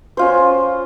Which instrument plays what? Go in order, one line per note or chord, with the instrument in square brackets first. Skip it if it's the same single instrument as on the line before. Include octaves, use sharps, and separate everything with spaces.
[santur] C#4 F4 C5